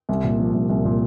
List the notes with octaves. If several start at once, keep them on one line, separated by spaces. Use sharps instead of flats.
C2
A#2
F3
C2
C2
A#2